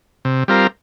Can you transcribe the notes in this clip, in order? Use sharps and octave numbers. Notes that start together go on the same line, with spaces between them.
C3
G3 C4 F4 A#4